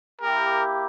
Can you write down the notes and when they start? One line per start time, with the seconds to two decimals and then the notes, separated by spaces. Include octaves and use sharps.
0.21 A#3 E4 G4 A#4